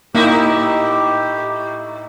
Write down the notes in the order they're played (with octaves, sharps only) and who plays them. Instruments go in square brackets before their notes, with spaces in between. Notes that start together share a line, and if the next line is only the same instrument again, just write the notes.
[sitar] A2 D#4 E4 [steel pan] A#3 [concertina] G4